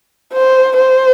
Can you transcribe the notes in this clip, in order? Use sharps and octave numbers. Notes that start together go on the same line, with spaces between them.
C5
C5